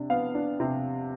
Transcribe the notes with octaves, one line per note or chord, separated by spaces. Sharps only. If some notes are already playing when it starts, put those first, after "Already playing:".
Already playing: C3 D4
B3 F5
D4
C3